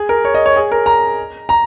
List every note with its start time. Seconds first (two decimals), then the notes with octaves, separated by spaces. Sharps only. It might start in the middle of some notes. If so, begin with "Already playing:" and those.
Already playing: G#4
0.09 A#4
0.25 C#5
0.34 D#5
0.46 C#5
0.56 G#4
0.72 A#4
0.86 A#5
1.49 A#5